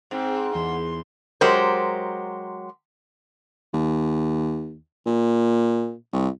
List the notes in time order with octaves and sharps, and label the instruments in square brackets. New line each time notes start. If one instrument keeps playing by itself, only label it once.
[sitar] G#2 [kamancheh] C4
[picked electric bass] E2 [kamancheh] C6
[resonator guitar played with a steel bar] F#3 G#3 G4 A#4 C5
[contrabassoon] D#2
A#2
C2